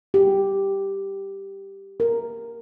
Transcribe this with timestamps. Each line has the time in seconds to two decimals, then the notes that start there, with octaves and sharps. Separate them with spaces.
0.14 G4
2.00 A#4